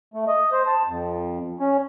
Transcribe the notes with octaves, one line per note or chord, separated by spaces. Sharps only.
A3
D#5
C5
A5
F2
C#4